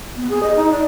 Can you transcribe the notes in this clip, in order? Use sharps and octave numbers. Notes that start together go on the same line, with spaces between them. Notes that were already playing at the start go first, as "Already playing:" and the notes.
B3
G#4
D#5
D#4
D5